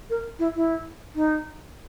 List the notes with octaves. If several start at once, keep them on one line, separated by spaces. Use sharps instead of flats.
A#4
E4
E4
D#4